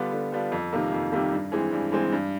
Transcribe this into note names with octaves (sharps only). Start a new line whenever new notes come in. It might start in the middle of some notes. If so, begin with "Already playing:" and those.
Already playing: D3 G3 B3 D4 F4
D3
G3 B3 D4 F4
F2
C3 D#3 G3 A#3
F2
C3 D#3 G3 A#3
G2
E3 G#3 C4
G2
E3 G#3 C4
G2